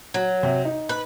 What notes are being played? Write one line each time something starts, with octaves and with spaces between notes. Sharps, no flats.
F#3
C3
D#4
B4